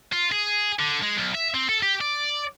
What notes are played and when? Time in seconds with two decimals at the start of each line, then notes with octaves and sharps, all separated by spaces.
0.12 F4
0.32 G#4
0.79 D3
1.03 G#3
1.18 B1
1.35 E5
1.55 C4
1.69 A4
1.83 G4
2.01 D5